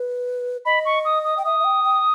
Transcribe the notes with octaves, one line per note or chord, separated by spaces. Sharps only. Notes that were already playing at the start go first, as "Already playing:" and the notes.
Already playing: B4
D#5 B5
C#6
D#6
D#6
G5
E5 D#6
E5
G5
G5